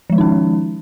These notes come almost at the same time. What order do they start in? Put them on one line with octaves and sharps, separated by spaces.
F3 G#3 D#3 D#4 C#4